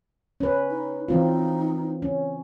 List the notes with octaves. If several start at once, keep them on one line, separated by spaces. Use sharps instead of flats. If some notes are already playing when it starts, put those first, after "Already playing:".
C#4 B4
D#4
E3 C4 D#4 F4
C#4